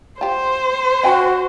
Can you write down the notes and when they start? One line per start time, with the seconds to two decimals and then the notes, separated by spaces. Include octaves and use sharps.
0.21 F4 G4 C5
1.03 C#4 F#4 G5 G#5